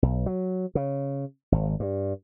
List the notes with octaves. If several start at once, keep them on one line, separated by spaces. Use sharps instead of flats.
B1
F#3
C#3
G#1
G2